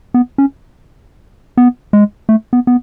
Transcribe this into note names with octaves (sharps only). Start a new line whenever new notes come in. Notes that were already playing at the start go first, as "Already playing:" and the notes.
B3
C#4
B3
G#3
A3
B3
B3